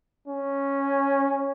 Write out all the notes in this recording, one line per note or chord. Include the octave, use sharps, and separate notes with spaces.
C#4